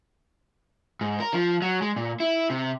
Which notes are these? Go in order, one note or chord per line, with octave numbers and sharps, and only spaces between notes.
G#2
A#4
F3
F#3
G#3
A#2
E4
C3